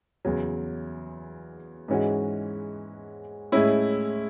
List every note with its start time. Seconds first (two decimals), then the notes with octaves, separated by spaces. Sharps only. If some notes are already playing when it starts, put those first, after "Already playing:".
0.25 E2 C#3 F#3
1.88 G#2 E3 G#3 C#4 F#4
3.52 A2 G#3 C#4 E4